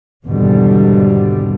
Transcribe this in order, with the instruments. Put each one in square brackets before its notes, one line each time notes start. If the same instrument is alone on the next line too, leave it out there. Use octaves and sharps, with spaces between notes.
[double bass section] G#1 E2 B2 D3 G3